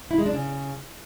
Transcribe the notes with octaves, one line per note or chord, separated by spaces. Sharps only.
E4
G#3
D4
C#3